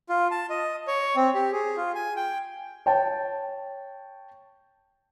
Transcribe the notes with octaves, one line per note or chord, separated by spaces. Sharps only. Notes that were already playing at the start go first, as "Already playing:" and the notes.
F4
A5
D#5
C#5
C4
G4
G#4
F4
G#5
G5
C#5 G5 A5